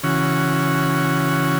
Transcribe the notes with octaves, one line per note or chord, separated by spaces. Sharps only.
C#3 E3 C#4 F#4